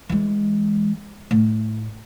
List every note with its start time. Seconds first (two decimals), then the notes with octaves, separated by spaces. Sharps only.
0.09 E3 G#3
1.31 A2